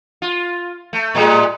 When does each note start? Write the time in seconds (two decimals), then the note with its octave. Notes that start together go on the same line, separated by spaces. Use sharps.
0.22 F4
0.93 A3
1.15 A2 G3 G#3